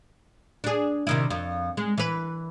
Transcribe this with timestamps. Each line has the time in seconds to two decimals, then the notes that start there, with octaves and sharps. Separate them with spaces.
0.64 D4 G#4
1.07 C3 D#3 E4
1.30 F2
1.77 G#3
1.98 E3 B4